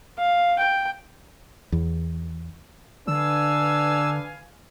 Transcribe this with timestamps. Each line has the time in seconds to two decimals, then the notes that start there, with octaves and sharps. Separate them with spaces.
0.18 F5
0.59 G5
1.72 E2
3.08 D3 D4 B4 F5 G#5 E6